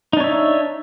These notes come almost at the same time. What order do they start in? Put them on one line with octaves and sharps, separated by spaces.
D#4 D4 C#5 E5